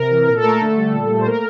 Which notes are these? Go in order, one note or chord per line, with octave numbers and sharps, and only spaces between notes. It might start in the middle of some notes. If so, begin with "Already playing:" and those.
Already playing: C3 A#4
E3
A#2 A#4
A4
A3 A#4
A4
D3
G3
A#2
A3
C5
A#3 A#4